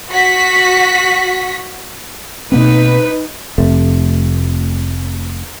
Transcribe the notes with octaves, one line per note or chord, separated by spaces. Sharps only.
F#4 B6
B2 A#3 C4 D#4 B4
F1 F2 C3 A3